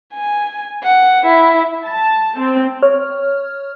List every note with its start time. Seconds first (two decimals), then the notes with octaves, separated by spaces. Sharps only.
0.13 G#5
0.83 F#5
1.25 E4
1.85 A5
2.37 C4
2.82 C#5 F6